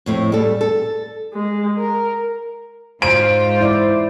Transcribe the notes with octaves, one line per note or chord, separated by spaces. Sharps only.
F2 A2 A3
G3 A4
A4
G#3
A#4
G#2 F4 C5 D7
E4 D5